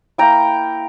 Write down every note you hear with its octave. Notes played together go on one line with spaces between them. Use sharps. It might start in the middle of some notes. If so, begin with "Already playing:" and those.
A#3 E4 G5 A#5